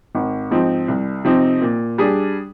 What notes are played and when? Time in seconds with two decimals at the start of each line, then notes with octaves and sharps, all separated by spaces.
0.15 G#1
0.51 G#2 F3 C4 D#4
0.88 C2
1.25 C3 F3 C4 D#4
1.62 A#2
1.98 G3 D4 G#4